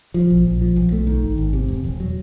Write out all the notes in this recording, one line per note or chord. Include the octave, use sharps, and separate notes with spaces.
F3
A#1
A#1
F3
B1
A3
D#3
G#1
G#1
C3
E1
E1
F#3